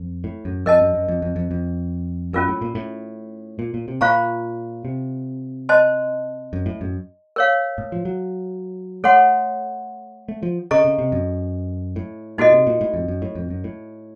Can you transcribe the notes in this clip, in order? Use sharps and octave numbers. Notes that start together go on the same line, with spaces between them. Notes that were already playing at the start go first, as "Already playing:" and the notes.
Already playing: F2
A2
F#2
F2 A#4 D#5 A5
F#2
F#2
F2
F2
F2
F2
F#2 C#4 F4 A#4
A2
A#2
A2
A#2
A#2
C3
A#2 F4 C5 F5 A#5 C#6
C3
C5 D#5 A5 C6
F#2
A2
F#2
A#4 C#5 F5
A2
F3
F#3
A3 A4 C#5 F#5 C6
A3
F3
C#3 A4 D#5 A#5 C#6
C#3
C3
F#2
A2
A#2 D#4 F#4 A4 D#5
C3
A#2
A2
F2
F#2
A2
F2
F#2
A2